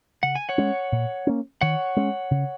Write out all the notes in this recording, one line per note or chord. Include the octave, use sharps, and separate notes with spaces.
C#3 F#5
G#5
C#5 F#5
G#3 C#4
A#2
A#3 C#4
D#3 C#5 F#5
G#3 C#4
C#3